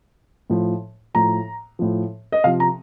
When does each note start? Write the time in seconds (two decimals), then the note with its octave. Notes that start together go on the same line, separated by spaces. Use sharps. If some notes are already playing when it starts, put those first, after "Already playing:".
0.50 A2 F3
1.14 A2 F3 A#5
1.79 A2 F3
2.32 D#5
2.44 C3 F3 F5
2.60 A#5